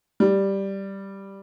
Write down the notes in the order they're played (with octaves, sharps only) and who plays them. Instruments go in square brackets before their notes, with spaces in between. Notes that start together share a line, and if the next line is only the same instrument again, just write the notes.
[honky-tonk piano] G3